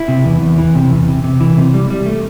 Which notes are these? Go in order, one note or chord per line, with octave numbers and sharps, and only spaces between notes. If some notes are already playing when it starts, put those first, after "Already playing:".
Already playing: E4
C3
E2
E2
E3
C3
E2
C3
C3
E3
C3
G3
G3
A3